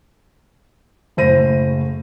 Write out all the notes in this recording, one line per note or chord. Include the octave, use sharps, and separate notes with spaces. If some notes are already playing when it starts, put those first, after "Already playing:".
F#1 A2 C5 A#6 D#7